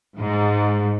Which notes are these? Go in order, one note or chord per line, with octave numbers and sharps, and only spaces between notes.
G#2